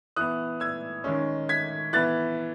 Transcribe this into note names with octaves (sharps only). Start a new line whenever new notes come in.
E3 B3 D#6 F#6
E6 G#6
D#3 G#3 C#4
G#6 B6
E3 B3 F#6 A6